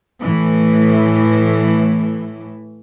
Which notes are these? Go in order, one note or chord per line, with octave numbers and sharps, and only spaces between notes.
A2 E3